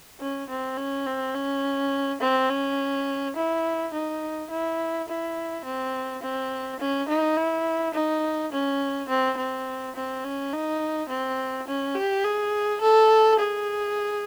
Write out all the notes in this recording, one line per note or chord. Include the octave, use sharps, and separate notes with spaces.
C#4
C4
C#4
C4
C#4
C4
C#4
E4
D#4
E4
E4
C4
C4
C#4
D#4
E4
D#4
C#4
C4
C4
C4
C#4
D#4
C4
C#4
G4
G#4
A4
G#4